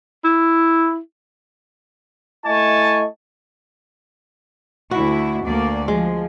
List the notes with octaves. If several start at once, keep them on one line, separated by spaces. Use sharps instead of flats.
E4
A3 E4 D#5 G#5 A5 C#6
D2 E4 F#4
D2 A#3 D5
F3 G#3